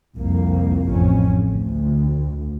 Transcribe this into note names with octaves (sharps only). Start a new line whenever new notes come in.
C2 F2 A#3
A1 F2 A2 C#4
D2